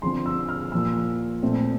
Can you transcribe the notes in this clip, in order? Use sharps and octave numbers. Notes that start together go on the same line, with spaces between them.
D3 F3 C4 C6
E6
F6
A#2 F3 A#3 E6
A#2 A3 C4